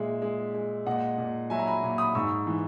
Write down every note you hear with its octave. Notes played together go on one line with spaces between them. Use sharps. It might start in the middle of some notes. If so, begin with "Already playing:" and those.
Already playing: A#2 G#3 E5
G#3
G#3
A#2 D#5 F#5
A#2
F#3 E5 G#5
A#5
G#5 B5
A#2
B5 D#6
G#2 C#6 E6
E3